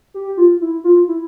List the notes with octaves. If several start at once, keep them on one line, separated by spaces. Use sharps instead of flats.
G4
F4
E4
F4
E4